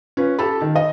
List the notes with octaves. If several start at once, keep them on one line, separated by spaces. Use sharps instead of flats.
C#4 F4 B4
G4 A4 A5 B5
D#3
D#5